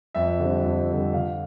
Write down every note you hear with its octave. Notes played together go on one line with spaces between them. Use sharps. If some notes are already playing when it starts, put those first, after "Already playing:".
F2 E5
D3 G3 C4
F2
D3 G3 C4
D3 F5